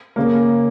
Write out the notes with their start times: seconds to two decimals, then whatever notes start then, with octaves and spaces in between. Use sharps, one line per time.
0.16 C#3 A#3